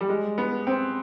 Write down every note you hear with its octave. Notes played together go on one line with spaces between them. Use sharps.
G3
G#3
B3
C4